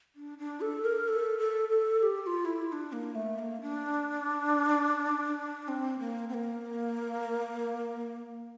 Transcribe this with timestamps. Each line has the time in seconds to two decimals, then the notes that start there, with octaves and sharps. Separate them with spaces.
0.16 D4
0.38 D4
0.61 A4
0.85 A#4
1.08 A4
1.39 A4
1.69 A4
1.99 A4
2.03 G4
2.22 G4
2.27 F4
2.45 E4
2.68 E4
2.72 D4
2.92 A#3
3.15 A3
3.38 A#3
3.61 D4
5.68 C4
5.99 A#3
6.29 C4
6.34 A#3